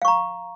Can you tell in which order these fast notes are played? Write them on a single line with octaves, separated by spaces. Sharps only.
F5 C#6 A#5